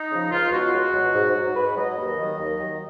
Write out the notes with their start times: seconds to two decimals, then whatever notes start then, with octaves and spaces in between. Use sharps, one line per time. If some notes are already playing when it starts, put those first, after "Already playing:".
Already playing: D#4
0.10 C#3 F3
0.31 C#2 F4
0.51 B2 F#3 F#4
0.72 C#2
0.93 B2 F#3
1.14 G#2
1.35 F#3
1.55 G#2 B4
1.76 F#3 D#5
1.97 D#2
2.18 D#3 F#3
2.38 D#2
2.59 D#3 F#3